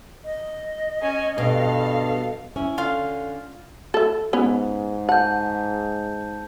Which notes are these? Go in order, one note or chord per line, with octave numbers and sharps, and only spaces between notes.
D#5
C#4 G#5
G2 B2 A4 F5
C#4 E4
D3 F4 F5
A4 E5
G#2 B3 C#4
F#5 A5 G6